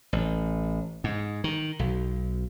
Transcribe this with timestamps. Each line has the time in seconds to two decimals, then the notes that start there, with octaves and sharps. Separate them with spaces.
0.13 A1
1.04 G#2
1.44 D#3
1.79 B1